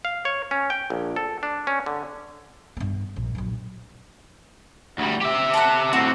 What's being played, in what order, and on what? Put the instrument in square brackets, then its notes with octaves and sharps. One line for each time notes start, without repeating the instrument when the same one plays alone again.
[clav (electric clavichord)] F5
C#5
C#4
G5
A#1
A4
D4
C#4
D3
[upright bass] G2 B3
A#1
A#1 F#3
[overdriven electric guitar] D2 G3
G4 E5
[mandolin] A4 F#5
[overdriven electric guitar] A2 C4 [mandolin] F#4